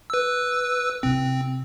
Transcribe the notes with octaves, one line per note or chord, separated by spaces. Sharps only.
B4 E6
C3 C4 E4